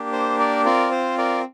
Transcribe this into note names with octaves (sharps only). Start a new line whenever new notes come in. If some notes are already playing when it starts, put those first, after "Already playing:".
Already playing: A#3 D4 G4
C5
A#4 D5
C4 F4 A#4 D5
C5
A#4 D5